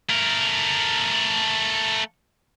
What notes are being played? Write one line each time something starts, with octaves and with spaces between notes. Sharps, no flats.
A3 A#4